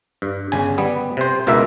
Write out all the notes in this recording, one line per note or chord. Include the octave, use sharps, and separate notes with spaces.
G2
G1 C#3 G#5
G3 B3
C3 C5
C#2 B2 A#3 E4 E5